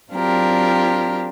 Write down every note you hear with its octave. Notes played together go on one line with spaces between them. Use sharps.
F#3 C4 D4 F4 G4 A#4